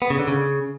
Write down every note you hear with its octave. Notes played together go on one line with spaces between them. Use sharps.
B3
C#3
D3
C#3